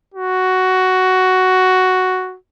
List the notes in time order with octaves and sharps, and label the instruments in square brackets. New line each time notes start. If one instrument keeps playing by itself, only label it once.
[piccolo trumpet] F#4